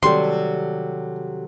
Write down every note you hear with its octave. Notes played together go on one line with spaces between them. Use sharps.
C3 D#3 F#3 G3 G4 A4 C6